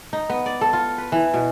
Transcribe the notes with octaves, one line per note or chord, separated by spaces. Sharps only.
D#4
B3
D5
A4
F4
B4
E3
B2